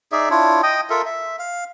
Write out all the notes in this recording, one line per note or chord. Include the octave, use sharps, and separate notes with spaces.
D#4 G#4 D5 E5
D4 E4 F4 C#5
D#5 G5 D#6
F4 A4 A#4 E5
E5
F5